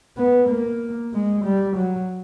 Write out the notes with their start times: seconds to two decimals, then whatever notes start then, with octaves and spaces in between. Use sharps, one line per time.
0.17 B3
0.48 A#3
1.14 G#3
1.45 G3
1.77 F#3